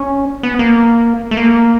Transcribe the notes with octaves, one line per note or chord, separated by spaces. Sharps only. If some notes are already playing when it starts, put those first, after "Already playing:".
Already playing: C#4
B3
A#3
A3
A#3